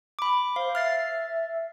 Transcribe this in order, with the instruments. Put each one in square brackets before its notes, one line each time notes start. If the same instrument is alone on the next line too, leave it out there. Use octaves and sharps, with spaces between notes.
[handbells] B5 D6
[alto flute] C5 [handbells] F5
[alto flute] E5 [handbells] F6 A6 C7